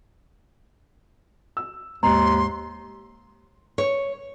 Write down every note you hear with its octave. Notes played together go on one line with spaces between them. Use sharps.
E6
D#2 G#2 A#5 C6
C#5